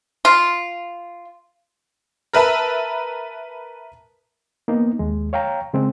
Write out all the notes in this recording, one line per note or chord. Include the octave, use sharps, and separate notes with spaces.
F4
A#4 B4 E5 A5
A#3 B3 D#4
D#2 G#3
C#5 F5 G5 A#5
C#3 G#3 C4